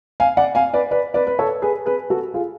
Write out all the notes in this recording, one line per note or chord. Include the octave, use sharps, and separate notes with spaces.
F5 G#5
D5 F#5
F5 G#5
B4 D5
B4 D5
B4 D5
B4
A4 C#5
G#4 B4
G#4 B4
F#4 A4
F4 G#4